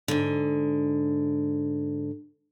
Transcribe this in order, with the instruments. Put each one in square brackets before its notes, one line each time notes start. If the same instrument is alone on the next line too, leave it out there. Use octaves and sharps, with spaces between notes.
[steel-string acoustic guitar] G#2 D3